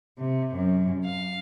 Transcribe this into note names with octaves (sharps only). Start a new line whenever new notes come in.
C3
F#2
F5